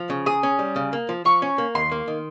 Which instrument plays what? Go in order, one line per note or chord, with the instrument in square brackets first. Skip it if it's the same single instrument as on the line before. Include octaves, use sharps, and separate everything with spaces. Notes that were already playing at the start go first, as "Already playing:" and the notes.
Already playing: [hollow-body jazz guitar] F3
C#3
[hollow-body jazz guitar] G#4 [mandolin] D#6
[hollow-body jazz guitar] C#4
G3
C#3
A#3
F3
[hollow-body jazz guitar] F3 [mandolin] C#6
[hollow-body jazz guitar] C#4
A#3
[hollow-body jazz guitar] D#2 [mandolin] C6
[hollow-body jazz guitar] A#3
D#3